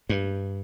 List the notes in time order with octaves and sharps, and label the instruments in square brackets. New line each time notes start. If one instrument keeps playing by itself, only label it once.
[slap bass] G2